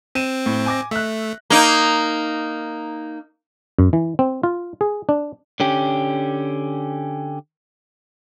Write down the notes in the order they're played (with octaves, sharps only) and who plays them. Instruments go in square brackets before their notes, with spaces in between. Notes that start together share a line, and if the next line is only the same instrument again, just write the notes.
[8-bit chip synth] C4 [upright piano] D#7 E7
[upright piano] A2
G#5 D6 A#6
[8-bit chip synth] A3 [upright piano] E5 F#6
[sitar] A#3 D#4
[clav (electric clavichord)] F#2
E3
C4
F4
G#4
D4
[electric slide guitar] D3 C#4 G4